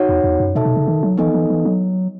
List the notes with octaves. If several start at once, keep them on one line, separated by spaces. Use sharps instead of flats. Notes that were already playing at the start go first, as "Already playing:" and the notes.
Already playing: D#4 F#4 C#5 F#5
E2
E2
F#2
B2 D#4 A4 E5 A5
B2
C#3
D#3
F#3
E3 B3 D#4 A4 D#5 G#5
E3
E3
F#3